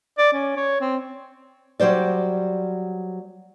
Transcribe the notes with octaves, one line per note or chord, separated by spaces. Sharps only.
D5
C#4
C#5
C4
F#3 G3 C5 D5